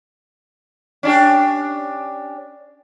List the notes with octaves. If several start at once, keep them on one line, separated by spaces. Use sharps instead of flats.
C#4 D4 G4